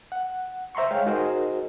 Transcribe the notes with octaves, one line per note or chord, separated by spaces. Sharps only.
F#5
C5 E5 A#5 C6 C#6
G#3 C#5 F5 G5
D#4 F#4 G#4 A#4 C5 D#5